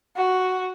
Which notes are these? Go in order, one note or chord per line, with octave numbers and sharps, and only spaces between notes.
F#4